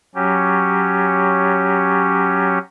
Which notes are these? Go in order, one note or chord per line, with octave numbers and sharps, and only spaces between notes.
F#3 C#4 G4